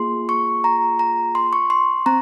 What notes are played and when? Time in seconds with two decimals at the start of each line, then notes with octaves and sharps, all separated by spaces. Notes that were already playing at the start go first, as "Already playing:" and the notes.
Already playing: A#3 F4 G#4 C6
0.29 C#6
0.64 A#5
0.99 A#5
1.35 C6
1.53 C#6
1.70 C6
2.06 C4 A#5